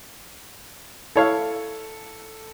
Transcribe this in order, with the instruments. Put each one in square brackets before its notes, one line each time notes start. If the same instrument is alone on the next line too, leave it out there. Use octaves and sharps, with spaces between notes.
[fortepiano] E4 C#5 F5 [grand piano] A4